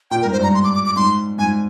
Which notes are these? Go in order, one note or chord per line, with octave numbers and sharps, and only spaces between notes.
A#2 G5
A#4
G#2
C5
G2 A#5
C6
D6
D6
D6
G#2 C6
G#2 G#5